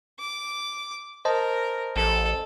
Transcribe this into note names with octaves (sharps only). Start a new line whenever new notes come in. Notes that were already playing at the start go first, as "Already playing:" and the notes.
D6
A#4 C5 D#5 A5
A1 A4